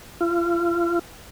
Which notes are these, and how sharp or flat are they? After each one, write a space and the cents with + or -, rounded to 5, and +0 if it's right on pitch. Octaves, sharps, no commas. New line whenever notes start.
F4 -35